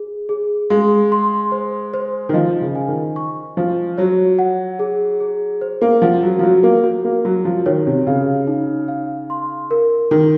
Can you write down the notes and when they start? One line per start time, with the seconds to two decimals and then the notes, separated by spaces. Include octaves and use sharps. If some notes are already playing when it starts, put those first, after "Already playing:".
Already playing: G#4
0.29 G#4
0.70 G#3 F5
1.12 C6
1.52 C5
1.94 C5
2.29 D#3
2.33 F3 D#5
2.61 C#3
2.75 G#5
2.88 D#3
3.16 C#6
3.57 F3 C5
3.98 F#3 C#5
4.39 F#5
4.79 G#4
5.20 G#4
5.61 C5
5.81 A#3
6.02 F3 F#5
6.23 F#3
6.39 F3
6.43 F#3 F#4
6.63 A#3
6.84 F#4
7.04 A#3
7.25 F#3 F#4
7.45 F3
7.66 D#3 C#5
7.87 C3
8.07 C#3 F5
8.47 D#4
8.88 F5
9.30 C6
9.71 A#4
10.11 D#3 A#4